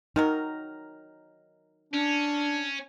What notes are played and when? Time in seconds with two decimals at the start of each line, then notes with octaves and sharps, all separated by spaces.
0.16 D#3 F#3 D#4 A#4
1.94 C#4 D4